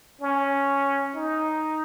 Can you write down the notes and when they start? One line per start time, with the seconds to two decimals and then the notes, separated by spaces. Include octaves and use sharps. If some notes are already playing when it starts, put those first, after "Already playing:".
0.21 C#4
1.16 D#4